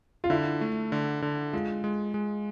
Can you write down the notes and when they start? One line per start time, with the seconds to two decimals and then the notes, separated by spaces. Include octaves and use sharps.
0.24 F4
0.30 D3 E4
0.61 A3
0.92 D3
1.22 D3
1.53 G#3 F4
1.84 G#3
2.14 G#3